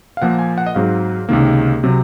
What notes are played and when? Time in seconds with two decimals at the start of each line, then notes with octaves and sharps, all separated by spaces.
0.17 F5
0.22 A#2 F3 A#3 F#5
0.39 G#5
0.58 F#5
0.66 D#5
0.75 G#2 F#3 C4 F5
1.29 C#2 C3 D#3 A#3
1.83 C3 F#3 C4